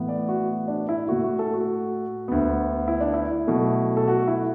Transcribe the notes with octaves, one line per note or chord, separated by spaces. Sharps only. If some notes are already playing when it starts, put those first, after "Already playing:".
Already playing: A2 E3 B3
D5
F#4
D4
E4
A2 A3 F#4
F#4
A4
F#4
D2 D3 B3
E4
D4
E4
B2 F#3 A3
A4
F#4
E4